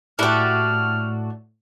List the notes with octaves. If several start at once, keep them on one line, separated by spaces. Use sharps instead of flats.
A2 D4 E4 F#4 G4 A4 F6